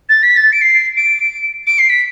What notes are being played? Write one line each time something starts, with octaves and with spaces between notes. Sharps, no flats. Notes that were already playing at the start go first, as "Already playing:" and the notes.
A6
B6
A6
D7
C7
D7
D7
C7
B6